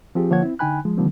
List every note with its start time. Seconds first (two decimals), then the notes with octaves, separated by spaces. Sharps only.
0.15 F3 C4 F4 G4 G#4
0.30 D3 F3 A#3 C#5 F#5 G#6
0.43 C4 E4
0.59 D3 D#4 G5 G#5 B5 F#6
0.85 F3 G#3
0.98 D3 D#3 F3 G3 A#3 C4